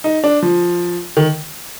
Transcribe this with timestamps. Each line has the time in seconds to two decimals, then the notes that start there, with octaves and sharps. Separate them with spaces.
0.04 D#4
0.24 D4
0.42 F3
1.17 D#3